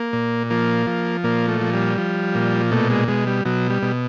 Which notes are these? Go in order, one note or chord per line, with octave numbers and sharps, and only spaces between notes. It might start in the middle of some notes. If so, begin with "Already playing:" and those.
Already playing: A#3
A#2
F3 A#3
F3
A#2 A#3
A3
F3
G3
F3
A#2
B2 A3
G#3
B2 G#3
G3
B2 F#3
G3
B2